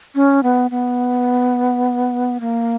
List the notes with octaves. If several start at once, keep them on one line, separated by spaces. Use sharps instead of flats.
C#4
B3
B3
A#3